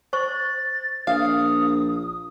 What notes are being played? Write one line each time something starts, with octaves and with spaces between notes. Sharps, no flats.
C5 C#6 A6
A#1 F5 D#6